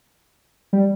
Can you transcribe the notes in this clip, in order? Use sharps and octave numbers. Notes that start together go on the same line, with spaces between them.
G3